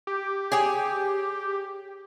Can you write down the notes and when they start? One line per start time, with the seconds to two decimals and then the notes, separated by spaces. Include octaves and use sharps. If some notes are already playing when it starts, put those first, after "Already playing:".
0.07 G4
0.52 G#4 C#5 G5